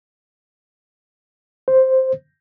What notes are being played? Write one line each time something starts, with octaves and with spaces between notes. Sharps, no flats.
C5